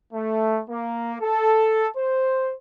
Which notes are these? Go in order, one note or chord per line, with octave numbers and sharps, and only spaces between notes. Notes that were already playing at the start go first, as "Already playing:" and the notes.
A3
A#3
A4
C5